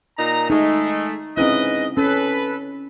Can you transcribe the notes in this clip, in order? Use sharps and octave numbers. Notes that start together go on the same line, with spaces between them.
A#2 D#4 A#5
G#3 A3 D#4
G#2 C4 C#4 E4 B4 D#5
C#4 A4 B4